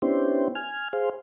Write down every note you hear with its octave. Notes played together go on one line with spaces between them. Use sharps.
B3 C#4 D4 E4 G4 C5
G#5 F6
G#4 C5 F5